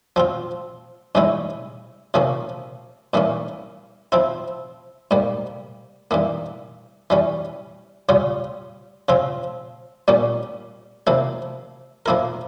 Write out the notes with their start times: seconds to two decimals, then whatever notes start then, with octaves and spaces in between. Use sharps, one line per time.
0.16 F3 C4 F4
1.15 G2 E3 G#3 C#4 E4
2.14 C3 F3 A#3 C#4
3.14 G2 E3 A#3 C#4
4.12 F3 C4 E4
5.11 G#2 G3 A#3
6.11 G2 E3 A#3
7.10 E3 G3 C#4
8.09 C#3 G3 C#4 F4
9.09 C#3 F3 C4 F4
10.08 A#2 G3 A#3 C#4 G4
11.07 C3 F3 A#3 E4
12.06 F3 A#3 E4 A#4